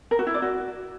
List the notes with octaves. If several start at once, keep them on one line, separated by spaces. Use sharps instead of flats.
A#4
F#4
E4
D5
F#4